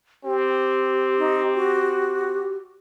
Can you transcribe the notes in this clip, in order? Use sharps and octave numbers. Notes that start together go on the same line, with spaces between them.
C4 G4
D#4
F#4